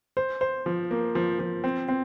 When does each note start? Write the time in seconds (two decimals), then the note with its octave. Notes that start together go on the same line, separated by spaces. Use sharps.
0.17 C5
0.41 C5
0.66 F3
0.91 A#3
1.15 F3
1.39 F3
1.64 C4
1.89 C4